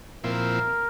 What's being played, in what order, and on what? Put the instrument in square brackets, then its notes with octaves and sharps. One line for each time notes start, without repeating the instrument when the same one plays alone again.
[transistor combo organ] A#2 F3 C4 E4 [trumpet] A#4